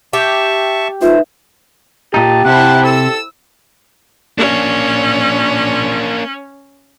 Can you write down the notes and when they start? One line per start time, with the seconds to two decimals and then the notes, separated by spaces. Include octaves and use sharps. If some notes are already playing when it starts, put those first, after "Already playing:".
0.13 G4 E5 A5 C#6
1.01 A3 D#4 F4 B4 C5 E5
2.14 A#2 D#4 G4 A5
2.45 C3 E4 C5 F#5 A5
2.85 A4 E6
4.38 A#3 C#4 D4